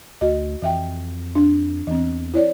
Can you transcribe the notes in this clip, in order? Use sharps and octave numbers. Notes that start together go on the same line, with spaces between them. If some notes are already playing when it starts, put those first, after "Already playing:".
D2 F#4 D#5
F2 E3 E5 G5
D4
E2 E3 C4
E4 C#5 D5